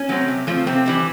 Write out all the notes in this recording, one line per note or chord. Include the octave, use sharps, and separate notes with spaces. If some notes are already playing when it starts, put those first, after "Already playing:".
Already playing: C#4
F#3 A3 C4
C3
F3 A3 C4
C3 C4
E3 G3 C4